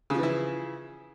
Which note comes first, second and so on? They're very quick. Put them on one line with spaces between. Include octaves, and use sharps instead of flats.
C#3 F3 E3 E4